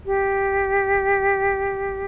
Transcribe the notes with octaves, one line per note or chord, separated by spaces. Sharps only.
G4